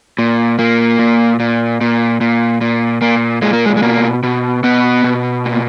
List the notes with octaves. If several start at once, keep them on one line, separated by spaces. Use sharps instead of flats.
A#2
A#2 A#3
A#2
A#2
A#2
A#2
A#2
A#2 A#3
A#2 G#3
A#3
G#3
G#3
B2 A#3
B2
B2 B3
B2
A#2